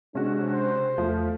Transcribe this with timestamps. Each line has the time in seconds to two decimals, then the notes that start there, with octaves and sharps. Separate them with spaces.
0.15 C3 G#3 C#4 D4 F#4
0.52 C5
0.98 E2 F3 A3